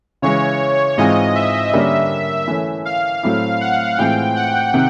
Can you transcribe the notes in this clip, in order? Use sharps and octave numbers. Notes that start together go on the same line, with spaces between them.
C#3 E3 G#3 C#5
G#2 E3 G#3 C4 F4 D#5
E5
D3 G3 A#3 C#4
E3 A3 C#4
F5
A2 F#3 A3 C4 E4
F#5
A2 E3 G#3 C4 F4 G5
F#5
C3 D#3